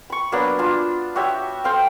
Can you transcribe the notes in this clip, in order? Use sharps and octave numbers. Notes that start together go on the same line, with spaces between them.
B5 C#6
F#3 A#3 B3 D4
D4 F4 A5
F#4 G4 C#5 E5
A4 C5 F5 G5